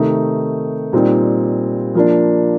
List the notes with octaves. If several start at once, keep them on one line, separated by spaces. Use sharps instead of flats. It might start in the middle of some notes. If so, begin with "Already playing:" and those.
Already playing: C3 D#3 A3 D#4
A#2 G3 C4 D#4
F3 A#3 D4